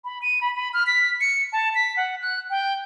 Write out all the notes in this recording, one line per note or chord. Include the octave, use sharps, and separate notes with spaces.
B5
D#7
B5
B5
F6
B6
C#7
A5
B6
F#5
F#6
G5